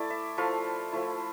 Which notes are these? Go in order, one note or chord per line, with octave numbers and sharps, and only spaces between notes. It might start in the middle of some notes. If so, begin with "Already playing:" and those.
Already playing: A3 E4 D5
E5
F3 A3 E4 F5
F3 A3 E4